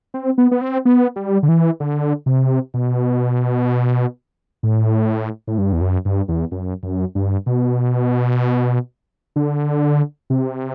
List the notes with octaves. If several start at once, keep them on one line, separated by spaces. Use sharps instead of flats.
C4
B3
B3
C4
B3
G3
D3
E3
D3
C3
B2
A2
A2
G2
E2
F#2
G2
E2
F#2
F#2
G2
B2
D3
C3